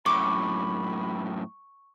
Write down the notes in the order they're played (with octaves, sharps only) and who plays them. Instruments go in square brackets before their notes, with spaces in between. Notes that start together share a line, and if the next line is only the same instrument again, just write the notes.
[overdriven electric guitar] F#2 A2 [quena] B5 [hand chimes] C#6 [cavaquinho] D6